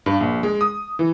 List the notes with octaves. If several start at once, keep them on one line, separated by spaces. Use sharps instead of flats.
G2
A#1
G#3
D#6
E3